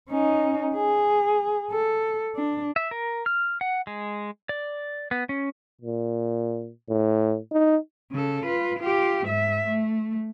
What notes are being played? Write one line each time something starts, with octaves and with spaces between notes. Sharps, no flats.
C#4 D#4
G#4
A4
D4
E5
A#4
F6
F#5
G#3
D5
B3
C#4
A#2
A2
D#4
C#3 A4
F4 B4
F4 G4
G#2 E5
A3